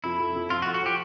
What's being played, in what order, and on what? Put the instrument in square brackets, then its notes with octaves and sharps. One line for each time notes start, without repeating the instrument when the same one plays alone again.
[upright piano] F2 [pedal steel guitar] E4
[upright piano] F2
F2
[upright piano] F2 [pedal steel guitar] F4
[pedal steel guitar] F#4
[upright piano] F2
[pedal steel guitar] F#4
[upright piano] F3 [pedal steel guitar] G4